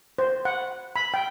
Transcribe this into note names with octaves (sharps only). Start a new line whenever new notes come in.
C5
F#5
B5
G5